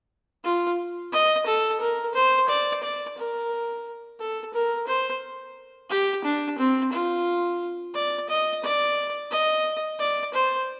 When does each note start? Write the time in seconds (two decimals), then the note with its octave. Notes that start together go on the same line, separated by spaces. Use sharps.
0.45 F4
1.13 D#5
1.47 A4
1.81 A#4
2.15 C5
2.49 D5
2.83 D5
3.18 A#4
4.20 A4
4.54 A#4
4.87 C5
5.90 G4
6.24 D4
6.58 C4
6.93 F4
7.95 D5
8.29 D#5
8.64 D5
9.31 D#5
10.00 D5
10.34 C5